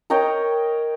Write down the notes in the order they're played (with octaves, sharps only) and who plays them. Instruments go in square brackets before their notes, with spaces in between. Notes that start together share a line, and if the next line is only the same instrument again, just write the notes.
[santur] A#4 C#5 D#5 G5